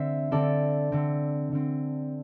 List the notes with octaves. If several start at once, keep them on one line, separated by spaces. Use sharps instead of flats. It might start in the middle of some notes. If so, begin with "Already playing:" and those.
Already playing: D3 C4 C5 E5
D3 C4 A4 D5
D3 C4
D3 C4